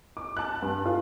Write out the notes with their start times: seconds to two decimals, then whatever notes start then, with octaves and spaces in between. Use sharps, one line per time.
0.17 D6
0.37 A5 F#6
0.62 G2
0.86 F4